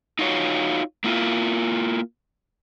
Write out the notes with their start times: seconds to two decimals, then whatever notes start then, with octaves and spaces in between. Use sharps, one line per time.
0.19 D#4 F4 F#4 C#5
1.04 A#3 E4 F4